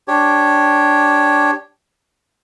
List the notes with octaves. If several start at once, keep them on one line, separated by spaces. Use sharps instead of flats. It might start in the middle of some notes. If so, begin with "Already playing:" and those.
D4 G4 C#5